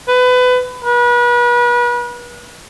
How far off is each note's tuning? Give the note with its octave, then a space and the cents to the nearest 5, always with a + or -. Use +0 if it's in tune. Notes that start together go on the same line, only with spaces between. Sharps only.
B4 +25
B4 -35